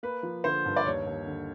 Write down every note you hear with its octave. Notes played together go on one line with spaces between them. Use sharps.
A#3 B4
F3
D3 C5
G2
D5
D#2 C#5
D#2
D3